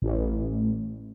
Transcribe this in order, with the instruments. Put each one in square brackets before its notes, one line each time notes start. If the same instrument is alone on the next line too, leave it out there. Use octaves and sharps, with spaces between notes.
[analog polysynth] A1